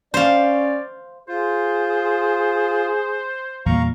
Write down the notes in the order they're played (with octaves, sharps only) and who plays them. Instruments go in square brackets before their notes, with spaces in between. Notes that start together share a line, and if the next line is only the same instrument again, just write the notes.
[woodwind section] C#4 D5 [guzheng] C5 F5
[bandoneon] F4 [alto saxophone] G#4 [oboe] C5
[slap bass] E2 A#2 G3 [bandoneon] F5 A#5 C#6